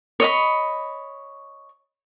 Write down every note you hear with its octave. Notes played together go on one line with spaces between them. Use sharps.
C#5 D#5 B5